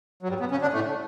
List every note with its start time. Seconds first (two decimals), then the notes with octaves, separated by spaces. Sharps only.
0.23 F#3
0.29 G2 G3
0.40 B2 B3
0.51 C#3 C#4
0.62 D3 D4
0.73 A2 A3